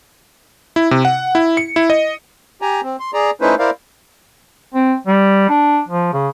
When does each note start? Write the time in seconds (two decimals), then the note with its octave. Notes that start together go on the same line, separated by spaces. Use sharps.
0.76 E4
0.91 C3
1.05 F#5
1.35 E4
1.57 C#7
1.76 E4
1.90 D#5
2.62 G4 G#5 A#5
2.83 C4
3.00 C6
3.14 G#4 D5 A#5
3.41 A3 C#4 D#4 E4 B4 C5
3.59 E4 A#4 C5 D5 F5
4.74 C4
5.07 G3
5.49 D4
5.88 F3
6.13 C#3